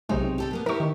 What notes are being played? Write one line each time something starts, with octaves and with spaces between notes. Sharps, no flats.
B1 C3 G#3 C4 D#4 C#5
G4 A4 G5
B2 A#3 B3
E4 G4 A#4 C#6
D#3